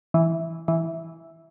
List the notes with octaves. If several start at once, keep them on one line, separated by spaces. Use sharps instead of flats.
E3
E3